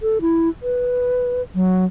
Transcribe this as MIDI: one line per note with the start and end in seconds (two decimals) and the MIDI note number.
0.02 0.21 69
0.21 0.49 64
0.63 1.42 71
1.55 1.85 54